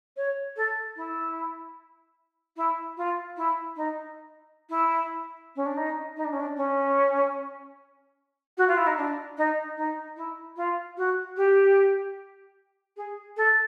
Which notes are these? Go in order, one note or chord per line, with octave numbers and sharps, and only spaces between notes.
C#5
A4
E4
E4
F4
E4
D#4
E4
C#4
D4
D#4
D#4
D4
C#4
D4
C#4
F#4
F4
E4
D#4
D4
D#4
D#4
E4
F4
F#4
G4
G#4
A4